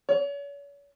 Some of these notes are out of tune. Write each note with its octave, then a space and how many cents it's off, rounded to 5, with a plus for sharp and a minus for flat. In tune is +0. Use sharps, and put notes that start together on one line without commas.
C#5 +40